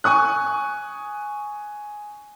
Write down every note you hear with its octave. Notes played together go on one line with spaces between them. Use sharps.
G#5 C#6 D#6 F#6